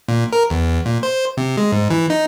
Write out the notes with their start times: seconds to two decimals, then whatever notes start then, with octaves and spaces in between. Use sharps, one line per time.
0.08 A#2
0.33 A#4
0.50 E2
0.86 A#2
1.03 C5
1.37 C3
1.57 G#3
1.72 G#2
1.90 E3
2.10 D#4